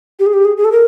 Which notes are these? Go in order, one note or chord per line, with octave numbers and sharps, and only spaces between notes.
G4
G#4
G4
G#4
G#4
A4
A#4